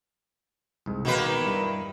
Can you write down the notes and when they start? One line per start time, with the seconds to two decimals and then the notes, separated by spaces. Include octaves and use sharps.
0.86 C2 G#2
1.05 B2 D#3 A#3 B4
1.44 G2 G3 E4